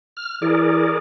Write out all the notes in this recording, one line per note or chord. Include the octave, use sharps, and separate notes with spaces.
F6
E3 G#4 A#4 D5